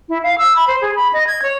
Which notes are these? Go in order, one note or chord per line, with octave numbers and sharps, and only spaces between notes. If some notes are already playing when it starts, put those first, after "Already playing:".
E4
F5
E6
B5
C5
G#4
B5
D#5
G#6
C#5